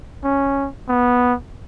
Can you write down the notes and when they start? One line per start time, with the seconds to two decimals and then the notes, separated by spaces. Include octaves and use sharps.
0.24 C#4
0.88 B3